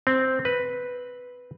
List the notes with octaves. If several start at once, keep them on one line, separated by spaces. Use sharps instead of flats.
C4
B4